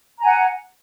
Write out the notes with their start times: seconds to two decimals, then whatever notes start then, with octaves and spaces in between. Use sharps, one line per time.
0.19 A#5
0.22 G#5
0.26 F#5